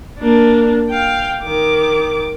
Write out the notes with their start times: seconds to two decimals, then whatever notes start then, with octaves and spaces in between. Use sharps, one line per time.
0.19 A#3 D4
0.90 F5 G5
1.44 D#3 D6